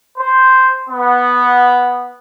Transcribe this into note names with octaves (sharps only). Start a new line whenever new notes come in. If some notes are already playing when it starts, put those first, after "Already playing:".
C5
B3